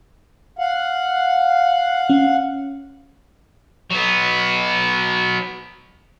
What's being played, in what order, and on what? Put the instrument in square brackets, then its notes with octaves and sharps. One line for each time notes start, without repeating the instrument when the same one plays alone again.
[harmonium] F5 F#5
[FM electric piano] C#4
[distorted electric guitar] F#3 B3